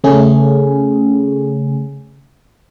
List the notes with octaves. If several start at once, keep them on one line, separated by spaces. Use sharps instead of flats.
C#3 A3 C#4 G#4